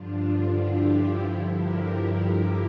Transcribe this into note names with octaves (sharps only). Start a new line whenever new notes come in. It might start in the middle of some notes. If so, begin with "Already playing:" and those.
Already playing: G2 D3 F3 D4 F4
E4 G4
D4 F4
G2 D3 F3 E4 G4
G4 A#4
G4 A#4
G4 A#4